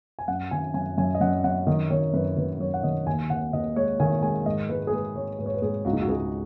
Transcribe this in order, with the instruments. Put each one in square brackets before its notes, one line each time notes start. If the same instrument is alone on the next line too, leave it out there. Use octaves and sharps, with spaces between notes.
[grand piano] G#5
F#2 F#5
D#3 G#5
F#2 G#5
F#2 G#5
D#5
F#2 F#5
F#2 F#5
D#3 D#5
D#3 C#5
F#2 B4
D#3 B4
F#2 C#5
F#5
D#3 D#5
D#2 G#5
D#2 F#5
D#2 D#5
G#3 C#5
D#3 G#5
G#3 G#5
G#2 D#5
G#3 B4
G#4
G#3 B4
G#2 C#5
G#2 B4
C#5
B4
G#2 G#4
C#2 F#4
D#4
F#4
C#2 G#4